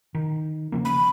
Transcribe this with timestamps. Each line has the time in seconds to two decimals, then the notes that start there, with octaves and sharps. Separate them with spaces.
0.15 D#3
0.72 C#3 F3 A#3
0.85 B5